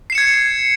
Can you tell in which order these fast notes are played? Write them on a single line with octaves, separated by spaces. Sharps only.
C7 E7 C#7 G#6